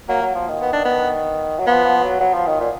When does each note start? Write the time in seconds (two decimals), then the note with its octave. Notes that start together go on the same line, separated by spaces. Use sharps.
0.09 F#3 A#3
0.22 F#3
0.35 F3
0.49 D#3
0.62 B3
0.73 D4
0.85 B3
1.59 F#3
1.67 F3 B3
1.85 F3
2.03 F#3
2.20 F#3
2.34 F3
2.47 D#3
2.60 A#2